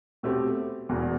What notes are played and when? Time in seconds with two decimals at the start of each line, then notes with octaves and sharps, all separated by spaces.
0.23 B2 A3 C4 G4
0.89 E1 E2 B2